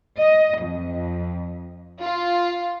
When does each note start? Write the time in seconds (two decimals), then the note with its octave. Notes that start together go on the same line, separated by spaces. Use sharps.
0.19 D#5
0.60 F2
1.99 F4